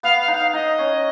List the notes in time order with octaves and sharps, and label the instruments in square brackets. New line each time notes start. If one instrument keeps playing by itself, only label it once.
[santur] B3 [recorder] F5
[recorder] F5
[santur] D#4 [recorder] F#5
[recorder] F5
[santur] D#4 [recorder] D#5
[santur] C#4